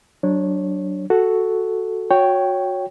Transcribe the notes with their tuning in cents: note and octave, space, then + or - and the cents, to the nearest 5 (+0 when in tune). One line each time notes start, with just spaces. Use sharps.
F#3 +20 D4 +0 C#5 -25
F#4 +0 A4 +0
F#4 -25 C#5 +0 G5 +0